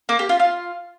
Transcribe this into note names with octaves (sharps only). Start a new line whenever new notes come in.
A#3
G4
F4
F4